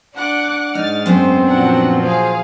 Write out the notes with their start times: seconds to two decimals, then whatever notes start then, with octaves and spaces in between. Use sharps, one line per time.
0.15 D4 F#5 D6 F#6
0.75 G#2 D#4 F6 A6
1.06 F#2 B3 C4 C5
1.50 A#2 F3 F#3 D4 F#5
2.02 G#4 C5 F5